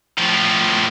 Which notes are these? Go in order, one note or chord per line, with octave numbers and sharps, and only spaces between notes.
A2 F3